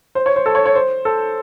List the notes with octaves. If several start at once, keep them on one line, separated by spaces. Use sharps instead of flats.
C5
C#5
C5
A4
C#5
C#5
C5
A4